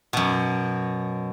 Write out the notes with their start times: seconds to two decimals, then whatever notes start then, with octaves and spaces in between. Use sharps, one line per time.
0.13 F#2 B2